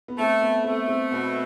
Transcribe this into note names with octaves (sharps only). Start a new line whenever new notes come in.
B3
A3 C4
B3
A3 C4
C4
B2 B3